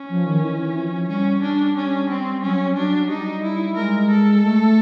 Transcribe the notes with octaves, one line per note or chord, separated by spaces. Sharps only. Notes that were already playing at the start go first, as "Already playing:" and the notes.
Already playing: C#4
F3
D#3
E3
F3
G3 C#4
D4
C#4
C4
F#3 C#4
F#3 D4
G3 D#4
E4
G#3 A#4
A4
A3